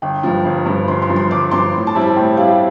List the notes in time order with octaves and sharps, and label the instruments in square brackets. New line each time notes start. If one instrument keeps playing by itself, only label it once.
[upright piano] G1 [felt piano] G5
[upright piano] G2 F3
G1
G2 F3
[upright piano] G1 [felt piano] C6
[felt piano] C6
[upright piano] G2 F3
[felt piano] C6
[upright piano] G1 [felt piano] D6
[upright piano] G2 F3 [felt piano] C6
[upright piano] A2
[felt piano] A5
[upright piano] G3 C4 E4
[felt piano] A5
[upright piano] A2 [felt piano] G5
[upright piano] G3 C4 E4 [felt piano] F5